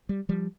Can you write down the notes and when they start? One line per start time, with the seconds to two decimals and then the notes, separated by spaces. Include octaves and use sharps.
0.09 G3
0.29 F3 G3